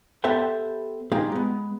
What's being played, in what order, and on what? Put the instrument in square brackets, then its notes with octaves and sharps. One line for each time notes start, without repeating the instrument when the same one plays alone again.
[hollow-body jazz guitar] B3 G4 A4 C5 E5 G5
A#3 D#4 F4 G4 G#4
G#3 B3